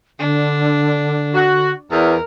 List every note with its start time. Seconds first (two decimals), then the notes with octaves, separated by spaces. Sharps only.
0.19 D3 D4
1.34 F#4
1.91 E2 A#4